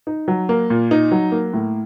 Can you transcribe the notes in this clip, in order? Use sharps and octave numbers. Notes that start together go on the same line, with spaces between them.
D#4
F#3
A#3
A#2
D#4
F#3
A#3
A2